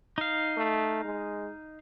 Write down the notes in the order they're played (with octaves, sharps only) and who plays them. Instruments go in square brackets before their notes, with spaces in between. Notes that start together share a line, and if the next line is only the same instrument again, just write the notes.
[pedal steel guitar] D#4 F5
[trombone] A3
G#3